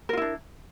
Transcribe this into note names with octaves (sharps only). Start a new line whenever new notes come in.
D4 E4 F4 A#4